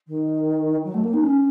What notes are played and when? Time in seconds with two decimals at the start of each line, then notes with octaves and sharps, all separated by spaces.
0.07 D#3
0.84 F#3
0.94 A3
1.03 A#3
1.13 D#4
1.23 C#4